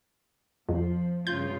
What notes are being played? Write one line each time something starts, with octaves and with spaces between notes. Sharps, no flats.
F2 F3
G2 C#3 F4 G6